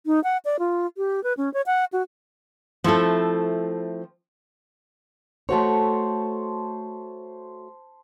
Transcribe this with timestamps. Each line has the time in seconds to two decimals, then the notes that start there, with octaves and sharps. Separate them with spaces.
0.06 D#4
0.24 F#5
0.45 D5
0.59 F4
0.97 G4
1.24 B4
1.37 C#4
1.54 C#5
1.66 F#5
1.93 F#4
2.84 F3 A3 C4 E4 A4
5.49 A3 F#4 C5 C#5 A5